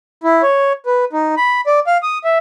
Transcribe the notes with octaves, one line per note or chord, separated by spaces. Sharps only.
E4
C#5
B4
D#4
B5
D5
F5
D#6
E5